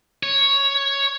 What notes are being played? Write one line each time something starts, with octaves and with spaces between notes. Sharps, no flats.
C#5